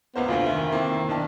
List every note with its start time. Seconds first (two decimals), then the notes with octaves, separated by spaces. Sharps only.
0.16 C#2 A#3 B3 C5
0.28 F1 D2 F4 C5
0.46 D#3 E5
0.72 A#3 C4 E4
1.09 B1 D4 A5